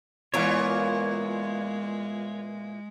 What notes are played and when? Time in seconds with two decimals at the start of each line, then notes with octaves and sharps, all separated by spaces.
0.34 A#2 E3 G#3 B3 F4 A#4 C#5